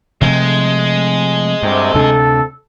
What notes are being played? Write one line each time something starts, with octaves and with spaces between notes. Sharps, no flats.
C3 F3 G#3 A3
D2 G2 C3
D2 C3 D4 A4